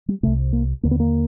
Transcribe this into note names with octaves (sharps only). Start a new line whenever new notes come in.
G3
C2 C3 A3
A#3
D#2 D3 A#3
B3
A#3